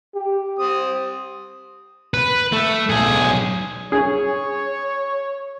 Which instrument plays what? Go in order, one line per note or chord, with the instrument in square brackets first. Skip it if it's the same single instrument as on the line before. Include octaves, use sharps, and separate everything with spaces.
[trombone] G4
[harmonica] C4 D#6
[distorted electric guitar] B4
A3
B1 G#4
[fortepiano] G#4 [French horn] C#5